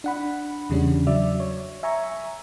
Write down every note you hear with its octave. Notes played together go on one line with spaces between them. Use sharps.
D4 F#5 B5
E2 C#3 G3 C#4 D4
F#3 D5 E5
C#5
E5 G#5 A#5 C#6